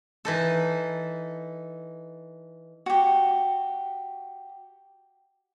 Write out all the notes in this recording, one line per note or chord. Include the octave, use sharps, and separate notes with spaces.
E3 D#4 A4
F#4 G4